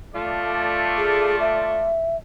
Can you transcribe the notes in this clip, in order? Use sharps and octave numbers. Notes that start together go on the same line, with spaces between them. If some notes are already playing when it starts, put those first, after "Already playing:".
A3 F4 D5
G#4
E5